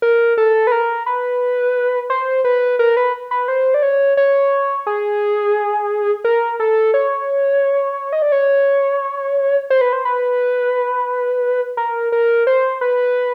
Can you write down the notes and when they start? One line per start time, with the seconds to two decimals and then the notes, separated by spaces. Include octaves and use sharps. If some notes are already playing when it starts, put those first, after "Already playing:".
0.02 A#4
0.38 A4
0.67 B4
0.72 A#4
1.06 B4
2.10 C5
2.44 B4
2.79 A#4
2.97 B4
3.31 B4
3.48 C5
3.74 D5
3.83 C#5
4.17 C#5
4.87 G#4
6.25 A#4
6.60 A4
6.94 C#5
8.13 D#5
8.22 D5
8.32 C#5
9.70 C5
9.81 B4
9.93 C5
10.05 B4
11.77 A#4
12.12 A#4
12.47 C5
12.81 B4